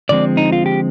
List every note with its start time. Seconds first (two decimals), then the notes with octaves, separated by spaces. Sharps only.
0.09 D3 F3 G#3 C4 D5
0.37 D#4
0.52 F4
0.66 G4